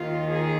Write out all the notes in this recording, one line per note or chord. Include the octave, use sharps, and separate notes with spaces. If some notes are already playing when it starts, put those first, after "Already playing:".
Already playing: D#2 D#3 F4
G#4